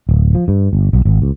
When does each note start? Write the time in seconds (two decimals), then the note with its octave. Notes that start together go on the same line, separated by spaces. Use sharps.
0.09 D1
0.35 F3
0.48 G2
0.73 G1
0.93 B1
1.05 G#1
1.22 C#2